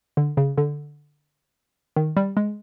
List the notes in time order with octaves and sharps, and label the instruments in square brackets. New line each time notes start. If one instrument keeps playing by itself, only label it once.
[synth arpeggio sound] D3
C#3
D3
D#3
G3
G#3